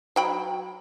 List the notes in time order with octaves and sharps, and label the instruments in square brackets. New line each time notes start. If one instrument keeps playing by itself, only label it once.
[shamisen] F#3 G5 B5